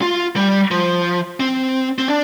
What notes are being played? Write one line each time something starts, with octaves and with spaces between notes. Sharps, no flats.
F4
G3
F3
C4
C4
D4